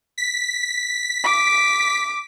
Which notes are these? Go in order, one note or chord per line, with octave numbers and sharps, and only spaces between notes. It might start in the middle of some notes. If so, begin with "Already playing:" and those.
B6
D6